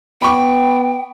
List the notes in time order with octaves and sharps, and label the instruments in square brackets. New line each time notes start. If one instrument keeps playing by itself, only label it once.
[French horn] B3 [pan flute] G5 [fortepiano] B5 C#6 D6